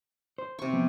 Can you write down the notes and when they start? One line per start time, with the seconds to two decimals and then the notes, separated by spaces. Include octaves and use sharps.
0.38 C5
0.59 C3 C#6
0.73 F3 B3